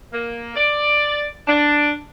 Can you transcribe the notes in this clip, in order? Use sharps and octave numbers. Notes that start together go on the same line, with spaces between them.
A#3
D5
D4